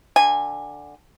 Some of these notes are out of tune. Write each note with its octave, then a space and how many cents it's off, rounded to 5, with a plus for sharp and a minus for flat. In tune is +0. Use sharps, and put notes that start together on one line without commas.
D3 +5 G#5 -20